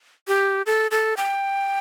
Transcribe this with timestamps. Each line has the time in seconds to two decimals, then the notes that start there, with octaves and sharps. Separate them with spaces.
0.28 G4
0.66 A4
0.91 A4
1.17 G5